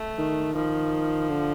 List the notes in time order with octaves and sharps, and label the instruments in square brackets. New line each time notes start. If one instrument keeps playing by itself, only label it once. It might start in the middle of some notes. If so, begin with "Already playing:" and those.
Already playing: [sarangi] A3
[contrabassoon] D#3
[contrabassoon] D#3 [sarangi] F3
[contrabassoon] D3